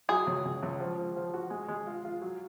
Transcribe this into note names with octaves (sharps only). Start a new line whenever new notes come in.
F#3 G#4
C#2
C#2
C#2
F3
F3
F3
F#4
G#3
G#3
F4
F4
F#3